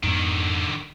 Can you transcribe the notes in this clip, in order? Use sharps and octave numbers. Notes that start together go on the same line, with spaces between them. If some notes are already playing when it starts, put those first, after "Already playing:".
F2 G#2 D3 D#3 B3